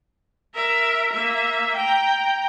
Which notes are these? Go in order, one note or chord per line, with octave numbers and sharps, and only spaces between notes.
A#4 E5
A#3 E5
G5 A#5